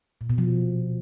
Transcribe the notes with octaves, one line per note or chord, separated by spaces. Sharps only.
A#2
B2
F3